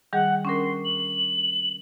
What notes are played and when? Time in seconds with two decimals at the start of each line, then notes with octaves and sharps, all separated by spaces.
0.13 D#3 G3 G#4 F#5
0.45 C#4 D4 A#4 C6
0.84 F#7